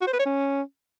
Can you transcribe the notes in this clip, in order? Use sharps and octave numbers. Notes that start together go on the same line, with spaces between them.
F#4
C5
B4
C#5
C#4